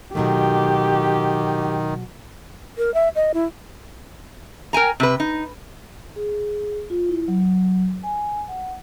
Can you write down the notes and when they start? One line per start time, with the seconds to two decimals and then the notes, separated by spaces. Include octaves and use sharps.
0.15 B2 D#3 F#3 A3 G4
2.78 A#4
2.94 E5
3.15 D#5
3.34 E4
4.73 A#4 G5 G#5 A#5
5.00 C3 B4
5.20 D#4
6.16 G#4
6.90 F4
7.09 E4
7.28 F#3
8.03 G#5
8.48 F#5